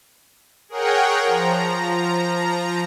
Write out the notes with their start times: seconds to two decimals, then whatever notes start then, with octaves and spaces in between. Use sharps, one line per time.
0.69 G#4 A#4 C#5 F#5 G5
1.21 F3 A#5